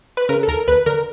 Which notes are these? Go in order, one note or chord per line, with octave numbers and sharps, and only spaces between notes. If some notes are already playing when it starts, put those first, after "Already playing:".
B4
C#3 A#4
A4
D#2 A#4
D#2 B4
D3 A#4